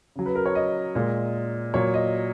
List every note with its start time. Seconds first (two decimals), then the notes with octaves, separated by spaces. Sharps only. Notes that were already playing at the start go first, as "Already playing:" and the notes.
0.16 C#3 F#3
0.26 B4
0.35 A#4
0.46 C#5
0.55 D#5
0.95 A#2 G#3
1.74 A#2 F#3 C#5
1.94 D#5